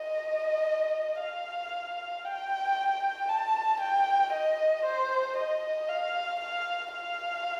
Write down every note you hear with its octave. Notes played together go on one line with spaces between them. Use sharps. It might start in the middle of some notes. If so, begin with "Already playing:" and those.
Already playing: D#5
F5
G5
A5
G5
D#5
C5
D#5
F5
F5
F5